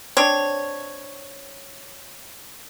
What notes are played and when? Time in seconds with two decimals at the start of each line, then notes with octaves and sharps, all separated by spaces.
0.17 C4 D4 C#5